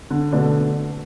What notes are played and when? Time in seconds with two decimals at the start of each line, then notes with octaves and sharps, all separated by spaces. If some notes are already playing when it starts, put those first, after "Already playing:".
0.11 D3
0.32 B2 D3 A3 D4